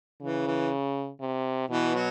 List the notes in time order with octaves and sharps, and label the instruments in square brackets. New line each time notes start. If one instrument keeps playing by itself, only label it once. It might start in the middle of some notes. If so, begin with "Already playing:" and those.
[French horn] C#3 [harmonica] E3
[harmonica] E3
[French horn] C3
[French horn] B2 [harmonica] E3
[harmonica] F#3